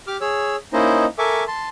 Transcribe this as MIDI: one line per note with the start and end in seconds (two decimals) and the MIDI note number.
0.07 0.17 67
0.07 0.17 86
0.07 0.17 89
0.21 0.56 68
0.21 0.56 73
0.21 0.56 88
0.73 1.06 58
0.73 1.06 61
0.73 1.06 63
0.73 1.06 64
0.73 1.06 72
0.73 1.06 75
1.18 1.44 69
1.18 1.44 70
1.18 1.44 76
1.18 1.44 80
1.18 1.44 85
1.18 1.44 86
1.48 1.69 81
1.48 1.69 84